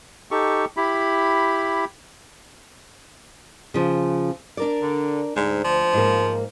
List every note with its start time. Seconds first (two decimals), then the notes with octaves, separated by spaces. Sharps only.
0.31 D#4 G4 A4 C#6
0.77 E4 G4 B5
3.74 C#3 F3
4.57 D4 A#4 D5
4.82 D3
5.36 D2 G#2
5.64 F3
5.93 G#2 A#3